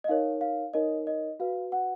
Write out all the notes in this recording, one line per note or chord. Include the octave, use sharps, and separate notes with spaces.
D#5
D#4 A#4 C#5 F5
F5
D#4 A#4 C#5 D#5
D#5
F#4 B4 F5
F#5